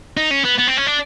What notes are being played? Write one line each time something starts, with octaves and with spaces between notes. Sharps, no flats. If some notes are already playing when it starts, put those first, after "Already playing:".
D#4
C#4
B3
B3
C4
C#4
D4